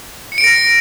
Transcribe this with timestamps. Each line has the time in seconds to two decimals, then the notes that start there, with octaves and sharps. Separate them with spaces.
0.32 C#7
0.38 D7
0.44 A#6